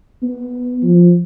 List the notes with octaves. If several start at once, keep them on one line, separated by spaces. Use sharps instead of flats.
B3
F3